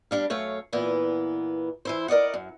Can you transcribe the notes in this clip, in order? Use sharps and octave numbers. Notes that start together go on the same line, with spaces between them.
G3 D4 F5
F#2 A3 C#5 F5
A#2 E3 B3
E3 E4 C5
A#4 D5 D#5 F#5
F#2